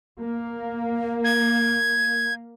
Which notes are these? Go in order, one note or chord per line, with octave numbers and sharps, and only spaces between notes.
A#3
G#6